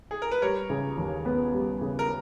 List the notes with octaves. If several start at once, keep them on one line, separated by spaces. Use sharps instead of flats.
G#4
A#4
B4
G3 A#4 C#5
C#3
D#2
B3
G3
C#3
A#4